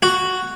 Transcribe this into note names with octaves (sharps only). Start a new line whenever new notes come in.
F#4